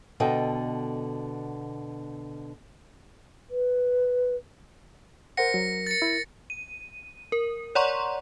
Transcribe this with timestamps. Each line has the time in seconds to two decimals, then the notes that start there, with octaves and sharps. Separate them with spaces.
0.20 B2 D3 F#4 A4 D#5 G5
3.50 B4
5.37 A#4 C5 F#5 A#6 C#7
5.54 F#3 A#4
5.87 A6 C#7
6.02 E4
6.50 D#7
7.32 A#4
7.75 C#5 D5 F#5 A#5 C6 C#6